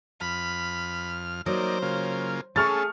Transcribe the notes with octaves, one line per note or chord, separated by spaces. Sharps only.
F2 B5 F6
F#3 A#3 D#4 C5 D5
C#3 A#3 F4
A3 C#4 G#4 A4 C#6 F6 A6